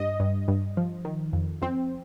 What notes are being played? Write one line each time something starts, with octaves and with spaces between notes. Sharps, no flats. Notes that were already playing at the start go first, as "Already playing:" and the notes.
Already playing: G2 D#5
G2
G2
F3
D#3
F2
F2 C4